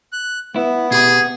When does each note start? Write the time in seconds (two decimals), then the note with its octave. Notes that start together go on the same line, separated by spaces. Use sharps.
0.12 F#6
0.56 B3 E4
0.91 B2 G4 G#4 B5